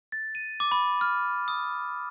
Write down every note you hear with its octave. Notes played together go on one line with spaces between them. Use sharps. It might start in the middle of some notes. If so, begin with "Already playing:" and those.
A6
D#7
D6
B5
F6
D#6